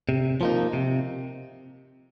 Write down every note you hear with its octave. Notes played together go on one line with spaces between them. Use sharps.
C3
F3 A#3 D#4
C3